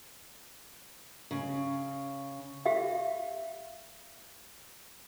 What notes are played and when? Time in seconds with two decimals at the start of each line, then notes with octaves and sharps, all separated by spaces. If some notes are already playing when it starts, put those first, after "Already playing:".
1.31 C#3
2.66 G4 E5 F5